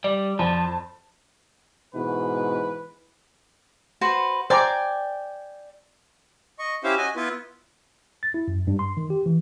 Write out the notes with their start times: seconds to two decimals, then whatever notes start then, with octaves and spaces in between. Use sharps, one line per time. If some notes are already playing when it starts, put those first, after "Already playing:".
0.04 G3 D5
0.39 F2 F3 A5
1.95 G#2 B2 E3 B4
4.01 F#4 B4 C5
4.50 C5 D5 G5 G#5 A#5 D6
6.59 D#5 C#6
6.84 C#4 E4 G4 C5 E5 F5
6.98 F#4 D#5 G#5
7.16 B3 E4 F4 B4
8.23 A6
8.34 E4
8.48 F#2
8.67 G2
8.79 C6
8.97 D#3
9.10 G4
9.26 E3